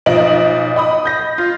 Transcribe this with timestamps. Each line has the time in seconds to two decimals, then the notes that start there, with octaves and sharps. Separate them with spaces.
0.06 B1 F3 D#4 D#5 D7 F#7
0.76 D#5 B5 D#6
1.05 G6 A#6
1.38 F4